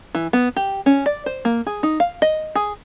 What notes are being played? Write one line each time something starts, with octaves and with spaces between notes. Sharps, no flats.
E3
B3
G4
C#4
D5
C5
A#3
G#4
D#4
F5
D#5
G#4